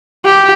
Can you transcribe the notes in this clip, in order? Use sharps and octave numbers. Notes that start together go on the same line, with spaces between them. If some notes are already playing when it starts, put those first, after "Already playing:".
G4